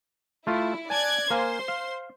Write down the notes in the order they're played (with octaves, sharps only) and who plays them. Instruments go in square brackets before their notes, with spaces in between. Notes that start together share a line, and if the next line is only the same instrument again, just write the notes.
[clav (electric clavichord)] A3 F4 [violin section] E4
[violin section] D5 F#6 G#6 [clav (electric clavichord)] G#5 A5
[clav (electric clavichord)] A#3 F5 G#5 [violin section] C5 C6
[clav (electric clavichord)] F5